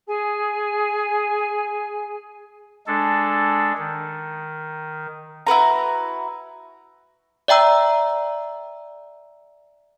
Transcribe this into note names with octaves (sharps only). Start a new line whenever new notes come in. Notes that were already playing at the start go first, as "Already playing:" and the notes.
G#4 G#5
G#3 D4 A4
D#3
E4 F#4 B4 A#5
D5 E5 G5 A#5 E6